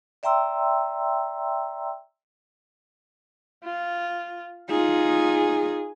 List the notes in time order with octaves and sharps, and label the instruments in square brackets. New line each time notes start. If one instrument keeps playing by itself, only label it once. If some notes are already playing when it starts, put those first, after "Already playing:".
[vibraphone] D5 E5 G5 A#5 C6 E6
[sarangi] F4
[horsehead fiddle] D#4 F4 [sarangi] G#4